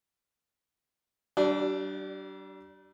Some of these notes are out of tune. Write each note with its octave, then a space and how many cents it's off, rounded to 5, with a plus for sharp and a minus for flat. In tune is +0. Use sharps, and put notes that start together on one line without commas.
G3 -40 D4 +0